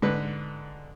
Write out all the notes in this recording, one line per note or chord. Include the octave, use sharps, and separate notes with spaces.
G#2 D3 B4